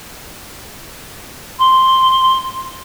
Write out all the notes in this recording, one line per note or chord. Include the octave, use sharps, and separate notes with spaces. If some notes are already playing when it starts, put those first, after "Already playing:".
C6